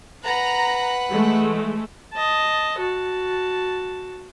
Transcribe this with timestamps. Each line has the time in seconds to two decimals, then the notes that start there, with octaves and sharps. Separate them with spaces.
0.25 B4 F#5 A#5
1.10 E3 G#3 A3
2.13 D#5 A5
2.78 F#4 A5